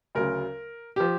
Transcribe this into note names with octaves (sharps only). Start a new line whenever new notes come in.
D2 C#3 F#3 A#4
F3 G4